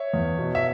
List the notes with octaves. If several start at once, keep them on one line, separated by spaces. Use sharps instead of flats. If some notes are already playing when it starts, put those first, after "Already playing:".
Already playing: C#5 E5
E2
B2
E5